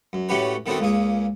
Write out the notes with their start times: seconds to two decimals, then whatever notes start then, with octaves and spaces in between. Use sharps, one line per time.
0.13 F#2
0.29 A2 A3 C#4 F#4 G4 B4
0.66 D#3 A3 B3 C4 D4 F#4
0.79 C#2 A#2 G#4